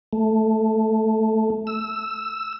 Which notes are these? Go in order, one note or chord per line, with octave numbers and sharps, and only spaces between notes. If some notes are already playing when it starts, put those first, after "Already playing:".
A3
E6